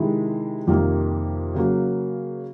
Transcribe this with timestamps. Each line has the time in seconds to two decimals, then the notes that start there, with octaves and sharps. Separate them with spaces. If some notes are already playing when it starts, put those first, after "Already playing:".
Already playing: C3 D#3 G#3 E4
0.67 F2 C3 D#3 G3 A#3
1.55 C#3 F#3 A#3